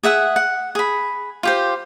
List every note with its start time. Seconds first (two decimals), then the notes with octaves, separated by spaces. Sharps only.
0.03 G#4 E5 F#5 D#6
0.36 F#5
0.75 G#4 B5
1.43 F4 G4 C5